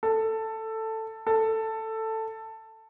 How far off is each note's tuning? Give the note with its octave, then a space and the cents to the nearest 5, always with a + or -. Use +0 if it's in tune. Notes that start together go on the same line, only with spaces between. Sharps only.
A4 +10
A4 +10